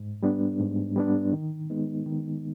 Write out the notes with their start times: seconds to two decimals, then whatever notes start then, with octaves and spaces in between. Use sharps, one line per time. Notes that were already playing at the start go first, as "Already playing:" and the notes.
Already playing: G#2
0.23 G3 B3 D4
0.59 G#2
0.96 G3 B3 D4
1.33 D#3
1.70 G#3 B3 D#4
2.06 D#3